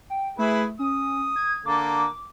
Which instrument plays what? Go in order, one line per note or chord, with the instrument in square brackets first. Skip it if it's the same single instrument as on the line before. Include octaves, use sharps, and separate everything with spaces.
[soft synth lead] G5
[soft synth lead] A3 [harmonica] E4 G#4 B4
[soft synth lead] C#4 [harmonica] D#6
[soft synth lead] G#6
[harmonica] D3 A#3 A4 [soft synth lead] D6